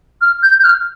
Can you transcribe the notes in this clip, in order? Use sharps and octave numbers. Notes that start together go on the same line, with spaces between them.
F6
G6
G6
F6